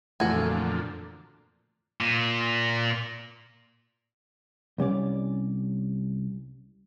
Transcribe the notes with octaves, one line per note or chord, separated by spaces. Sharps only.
F2 A#2 D3 E3 A3 F#4 A4 G#5
A#2
C2 G3 C#4 D5